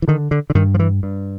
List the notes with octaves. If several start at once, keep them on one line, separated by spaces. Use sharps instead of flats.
E3
D3 D#3
D3
D3
G2 D#3
F3
E3
G2